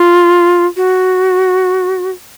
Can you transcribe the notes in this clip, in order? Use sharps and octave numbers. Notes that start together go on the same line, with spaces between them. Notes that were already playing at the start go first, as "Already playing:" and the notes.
Already playing: F4
F#4